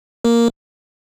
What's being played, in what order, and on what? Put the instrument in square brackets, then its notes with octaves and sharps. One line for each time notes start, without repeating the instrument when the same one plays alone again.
[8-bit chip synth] A#3 A#4